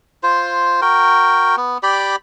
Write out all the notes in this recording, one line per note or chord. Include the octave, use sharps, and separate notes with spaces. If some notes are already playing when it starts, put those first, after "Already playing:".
F4 C5
F#4 A#4 G5
B3
G4 D5 G5 B5